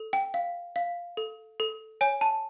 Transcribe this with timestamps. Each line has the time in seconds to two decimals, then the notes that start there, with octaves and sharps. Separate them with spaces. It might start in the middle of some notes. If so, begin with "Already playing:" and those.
Already playing: A4
0.13 G5
0.34 F5
0.76 F5
1.17 A4
1.60 A4
2.01 C#5 G#5
2.21 A5